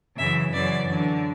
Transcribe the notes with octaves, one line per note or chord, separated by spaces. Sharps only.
F#2 C#3 E3 E5
F#2 C#3 E3 D5
F#2 D3